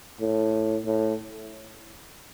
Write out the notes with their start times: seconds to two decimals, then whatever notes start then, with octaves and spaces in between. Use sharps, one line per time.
0.21 A2
0.86 A2